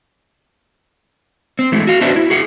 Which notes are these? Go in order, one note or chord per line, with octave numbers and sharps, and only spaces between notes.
C4
E3 G#3 A3
F#4 F5
B3 D4 F#4 B4 C5 E5
E4
F#4 G#4 F#5